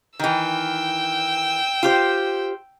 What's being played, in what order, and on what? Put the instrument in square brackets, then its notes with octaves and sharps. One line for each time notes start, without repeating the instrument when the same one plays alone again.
[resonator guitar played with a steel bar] D#3 E3 [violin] G5 E6
[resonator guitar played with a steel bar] F4 G4 C5